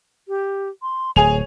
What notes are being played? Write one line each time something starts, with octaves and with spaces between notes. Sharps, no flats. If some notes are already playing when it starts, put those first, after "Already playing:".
G4
C6
D1 G#4 C#5 G#5 F7